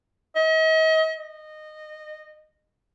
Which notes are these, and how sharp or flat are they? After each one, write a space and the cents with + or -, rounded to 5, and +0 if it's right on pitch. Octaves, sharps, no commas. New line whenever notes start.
D#5 +40
D#5 -20